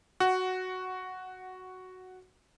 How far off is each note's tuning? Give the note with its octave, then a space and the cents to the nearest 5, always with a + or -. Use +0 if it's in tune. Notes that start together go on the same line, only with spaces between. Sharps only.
F#4 +0 F#5 +10